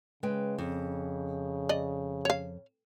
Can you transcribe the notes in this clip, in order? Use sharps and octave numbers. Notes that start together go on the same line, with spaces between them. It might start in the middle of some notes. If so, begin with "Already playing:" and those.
C#3 G#3 B4 G5
F2
D5 D#5
C#5 F5